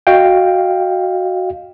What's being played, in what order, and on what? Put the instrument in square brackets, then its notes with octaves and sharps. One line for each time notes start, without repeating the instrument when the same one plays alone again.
[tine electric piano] F#4 D#5 F5 G5